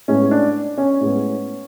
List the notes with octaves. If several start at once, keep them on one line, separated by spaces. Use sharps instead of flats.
A2 G#3 B3 C#4
D4
C#4
A2 G#3 B3